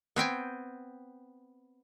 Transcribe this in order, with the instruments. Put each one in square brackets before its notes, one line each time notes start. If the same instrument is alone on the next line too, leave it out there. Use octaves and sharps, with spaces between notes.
[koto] B3 C4 G5 G#5